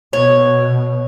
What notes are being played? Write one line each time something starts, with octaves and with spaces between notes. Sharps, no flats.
B2 C#5